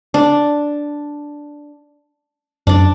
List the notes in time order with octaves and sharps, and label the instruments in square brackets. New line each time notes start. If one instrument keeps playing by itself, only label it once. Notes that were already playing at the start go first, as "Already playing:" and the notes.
[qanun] D4
[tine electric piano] F#2 [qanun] D4 D5